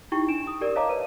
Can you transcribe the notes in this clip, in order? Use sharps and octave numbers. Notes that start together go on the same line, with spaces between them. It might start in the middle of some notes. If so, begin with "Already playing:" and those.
D#4 E4 G4 G5 C#6
D4 D7 E7
D#6
G4 A#4 D5
C#5 D#5 F5 A5 A#5 D6
B4 D#7